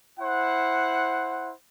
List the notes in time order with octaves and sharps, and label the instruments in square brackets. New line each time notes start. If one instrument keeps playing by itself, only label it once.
[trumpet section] E4 C5 F#5